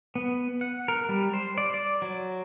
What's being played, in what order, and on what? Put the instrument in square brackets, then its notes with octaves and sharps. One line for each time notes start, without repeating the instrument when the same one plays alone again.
[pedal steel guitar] B3
F#5
A#4
G3
C5
D5
D5
F#3